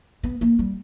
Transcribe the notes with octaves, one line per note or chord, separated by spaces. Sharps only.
B3
A#3
G3